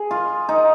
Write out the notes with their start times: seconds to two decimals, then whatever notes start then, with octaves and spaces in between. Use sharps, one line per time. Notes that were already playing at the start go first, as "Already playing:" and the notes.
Already playing: G#4
0.11 F4
0.49 D#4